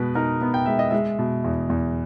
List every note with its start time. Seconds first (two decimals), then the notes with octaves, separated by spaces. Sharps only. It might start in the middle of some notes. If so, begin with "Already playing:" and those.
Already playing: B2 G#3 B3 B4
0.15 D#4 A#4
0.41 B3
0.54 G5
0.66 G#3 E5
0.79 D#5
0.91 G#3 E5
1.19 B2
1.44 E2
1.70 E2